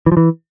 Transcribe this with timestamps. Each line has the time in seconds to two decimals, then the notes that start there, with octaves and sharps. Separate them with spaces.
0.06 E3
0.12 F3
0.17 E3